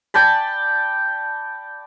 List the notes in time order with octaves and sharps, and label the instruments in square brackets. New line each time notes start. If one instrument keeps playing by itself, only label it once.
[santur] D5 G5 A5 B5